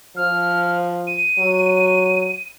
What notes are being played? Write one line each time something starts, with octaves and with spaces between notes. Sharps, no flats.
F3 F6
D#7
F#3